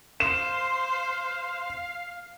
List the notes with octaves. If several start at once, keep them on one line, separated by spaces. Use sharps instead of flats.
C5 F5 E7